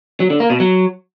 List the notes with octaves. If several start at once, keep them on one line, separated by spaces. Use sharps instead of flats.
F#3
D3
A#3
B2
F#3